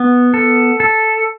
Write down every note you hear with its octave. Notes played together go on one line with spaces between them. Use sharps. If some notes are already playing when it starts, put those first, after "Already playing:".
Already playing: B3
A4
A4